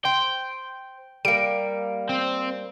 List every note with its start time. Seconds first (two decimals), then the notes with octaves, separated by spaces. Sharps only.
0.05 C5 G5
1.25 G3 A#3 D7
2.09 C4